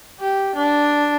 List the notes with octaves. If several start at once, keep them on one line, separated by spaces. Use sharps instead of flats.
G4
D4